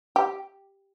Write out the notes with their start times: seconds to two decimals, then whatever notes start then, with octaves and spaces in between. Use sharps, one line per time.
0.16 G4